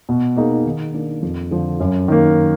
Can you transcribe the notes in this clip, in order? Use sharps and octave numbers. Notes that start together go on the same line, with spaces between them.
B2
A#3 D#4 G#4
D#3
A#3 D4
F2
D3 F3
F#2
D#3 A#3